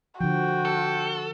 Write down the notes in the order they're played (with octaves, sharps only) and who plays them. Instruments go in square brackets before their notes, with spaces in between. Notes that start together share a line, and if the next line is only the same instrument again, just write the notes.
[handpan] D3 F3 [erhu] F#4 [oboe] G5
[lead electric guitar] A4